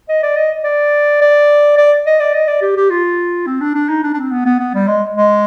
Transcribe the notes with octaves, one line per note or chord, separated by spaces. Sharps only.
D#5
D5
D#5
D5
D5
D5
D#5
D5
D#5
D5
G4
G4
F4
C4
D4
D4
D#4
D4
D4
C4
B3
B3
B3
G3
G#3
G#3